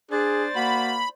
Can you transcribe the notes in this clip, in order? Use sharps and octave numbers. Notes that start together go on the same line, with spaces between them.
D4 G#4 C5 D5 A6
A#3 F#4 B5